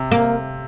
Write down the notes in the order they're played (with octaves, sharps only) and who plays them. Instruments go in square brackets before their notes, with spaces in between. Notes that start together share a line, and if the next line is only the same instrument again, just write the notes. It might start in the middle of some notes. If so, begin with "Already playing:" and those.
Already playing: [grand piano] C3
[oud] A#3